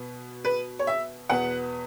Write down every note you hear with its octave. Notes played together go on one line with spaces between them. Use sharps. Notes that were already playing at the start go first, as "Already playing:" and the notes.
Already playing: B2 B3
B4
C#5
E5
E2 B2 B3 F#5